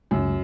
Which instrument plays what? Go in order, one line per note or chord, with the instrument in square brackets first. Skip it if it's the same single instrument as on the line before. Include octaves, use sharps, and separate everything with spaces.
[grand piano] C#2 [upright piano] F#2